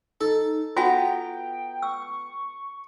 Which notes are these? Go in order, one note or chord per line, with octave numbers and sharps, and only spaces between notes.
D#4 A4
B3 F4 F#4 G5 G#5 A#5
C#6 E6